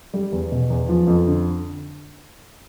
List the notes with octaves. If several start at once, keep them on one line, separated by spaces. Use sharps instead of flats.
G3
E2
B2
E2
F3
F2
D3